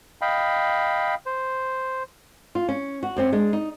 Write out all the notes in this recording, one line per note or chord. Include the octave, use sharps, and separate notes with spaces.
D#5 F5 G5 B5
C5
F4
C#4
F#4
F#2 C4 C#4
G#3 D4
D#4